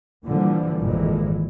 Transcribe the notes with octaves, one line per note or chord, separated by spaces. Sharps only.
A#2 D3 E3 F3 G3
G#1 F2 A#2 E3 G#3